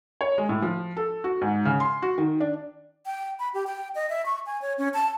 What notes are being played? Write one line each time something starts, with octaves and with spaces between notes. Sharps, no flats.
C#5
G#3
A2
F3
A4
F#4
G#2
C#3
C6
F#4
D#3
D4
G5
B5
G4
G5
D#5
E5
C#6
G#5
C#5
C#4
A5